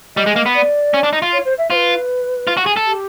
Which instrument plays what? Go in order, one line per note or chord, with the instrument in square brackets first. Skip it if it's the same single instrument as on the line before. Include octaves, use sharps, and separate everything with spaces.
[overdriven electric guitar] G3 [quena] D#5
[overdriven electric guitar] G#3
A#3
B3
[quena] D5
[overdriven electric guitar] C#4
D4
D#4
F4
[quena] C#5
C5
E5
[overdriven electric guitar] F4 [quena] C5
[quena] B4
[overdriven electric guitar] F4
F#4
G#4
A4
[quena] G4